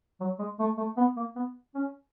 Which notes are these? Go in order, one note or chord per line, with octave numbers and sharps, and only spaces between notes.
F#3
G#3
A3
A3
B3
A#3
B3
C#4